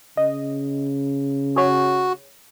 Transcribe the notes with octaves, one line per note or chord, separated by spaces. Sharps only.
C#3 D#5
F#4 G#4 C#5